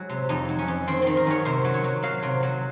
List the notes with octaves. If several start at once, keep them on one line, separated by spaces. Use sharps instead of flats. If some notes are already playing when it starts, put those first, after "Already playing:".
Already playing: F#3 G#3
C3
F2 D#4
F#3
C#4
F2
D#3 C4
D#3 C4
A#4
F#2 C#5
C3 C5
F#3
C#5
F#3
F#3 F5
C3
F#3